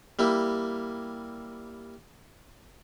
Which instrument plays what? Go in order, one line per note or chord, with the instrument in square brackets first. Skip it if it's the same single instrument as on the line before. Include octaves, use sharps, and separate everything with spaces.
[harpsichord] G3 A#3 E4